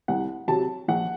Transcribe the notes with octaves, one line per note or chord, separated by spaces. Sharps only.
C2 F#5
C3 F#3 A5
A#1 F#5